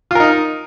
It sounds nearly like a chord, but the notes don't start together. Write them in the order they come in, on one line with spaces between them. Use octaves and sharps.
F4 A#4 D#4